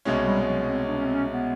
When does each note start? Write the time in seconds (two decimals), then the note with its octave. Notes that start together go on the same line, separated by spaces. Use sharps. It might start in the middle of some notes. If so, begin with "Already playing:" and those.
0.05 C2 B2 G#3 C#4
0.26 G3
0.46 F#3
0.67 C4
0.88 D4
0.97 C#4
1.05 C4
1.13 C#4
1.30 B3